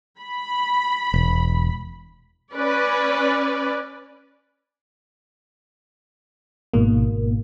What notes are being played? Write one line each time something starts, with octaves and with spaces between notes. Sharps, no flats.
B5
E1
C#4 B4 D5
G#1 G#2 B2 A#3